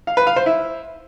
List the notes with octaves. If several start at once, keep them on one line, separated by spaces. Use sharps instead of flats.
F5
B4
F5
C5
E4